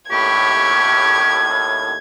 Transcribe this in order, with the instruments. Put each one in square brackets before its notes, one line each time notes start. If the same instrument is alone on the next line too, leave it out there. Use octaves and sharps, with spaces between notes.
[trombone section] D#2 A2 [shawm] G4 [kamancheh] B5 C#6 [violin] G#6